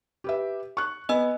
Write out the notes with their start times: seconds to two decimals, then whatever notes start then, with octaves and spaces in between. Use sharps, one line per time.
0.24 G4 B4 E5
0.77 C#6 F#6
1.09 B3 D#5 G#5 E6